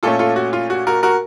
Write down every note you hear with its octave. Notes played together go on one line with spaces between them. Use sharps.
A#2 A3 C#4 F4 A4
F4 A4
F#4
F4
F#4
F#4 A#4
F#4 A#4